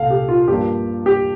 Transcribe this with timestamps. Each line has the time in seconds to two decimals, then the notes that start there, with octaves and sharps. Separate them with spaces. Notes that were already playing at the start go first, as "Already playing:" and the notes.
Already playing: C2 A#2 A4 F5
0.10 G4
0.29 F4
0.48 G2 F3 A#3 D4 G4
1.06 G4